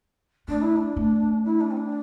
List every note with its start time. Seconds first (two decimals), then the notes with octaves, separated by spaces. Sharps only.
0.48 A3 D4
0.62 E4
0.76 D4
0.96 A3
1.45 E4
1.60 D4
1.71 C4
1.77 D4